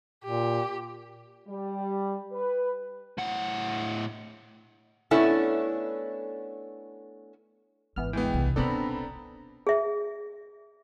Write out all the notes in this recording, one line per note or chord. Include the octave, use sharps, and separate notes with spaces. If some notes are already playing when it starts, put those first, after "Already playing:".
A#2 G4
G3
B4
A2 F#5
A3 B3 C#4 D4 E4 A4
G#1 E3 B3 F6
D2 E3 G#3 B3 G5
B1 C3
B2 B3 C4 D4 D#4 A4 A#5 B5
G#4 E5